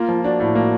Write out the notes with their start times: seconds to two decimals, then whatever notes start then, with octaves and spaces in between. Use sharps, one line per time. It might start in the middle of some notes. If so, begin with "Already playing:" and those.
Already playing: A#3 F4
0.08 F3
0.24 D4 F#4
0.40 A2
0.55 A#3